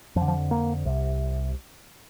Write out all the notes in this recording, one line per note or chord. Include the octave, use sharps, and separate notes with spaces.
F2 F3
D3
F3
A#3
C2 C3